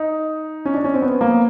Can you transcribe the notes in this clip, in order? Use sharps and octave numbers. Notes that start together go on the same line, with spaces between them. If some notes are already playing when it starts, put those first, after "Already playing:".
Already playing: D#4
C#4
D4
C#4
C4
B3
A#3